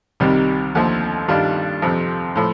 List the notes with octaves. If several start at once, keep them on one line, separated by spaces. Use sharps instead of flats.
C2 C3 D#3 G3
D#2 D3 F3 A3
G2 D#3 G3 D4 F4
F2 C3 F3 C4
A2 F3